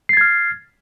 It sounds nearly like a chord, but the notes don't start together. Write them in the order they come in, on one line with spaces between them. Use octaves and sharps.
C7 A6 G#6 F6